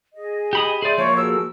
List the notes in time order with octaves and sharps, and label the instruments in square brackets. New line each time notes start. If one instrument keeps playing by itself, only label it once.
[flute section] G#4 D#5
[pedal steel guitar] G4 B5 D#6
[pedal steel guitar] G#4 D5 [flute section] E5 C6 G6
[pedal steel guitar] F3 A#3 [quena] C#5
[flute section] F#4 G#4 A4 [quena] E6